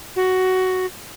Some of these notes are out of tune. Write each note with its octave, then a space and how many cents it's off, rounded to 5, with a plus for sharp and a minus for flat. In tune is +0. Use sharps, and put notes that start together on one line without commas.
F#4 +10